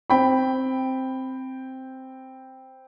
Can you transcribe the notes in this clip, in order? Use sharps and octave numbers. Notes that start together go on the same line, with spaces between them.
C4 G5 B5